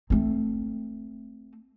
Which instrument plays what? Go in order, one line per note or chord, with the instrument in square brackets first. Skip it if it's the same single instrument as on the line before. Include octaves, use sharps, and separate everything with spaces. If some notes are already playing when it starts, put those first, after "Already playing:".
[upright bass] A3 C4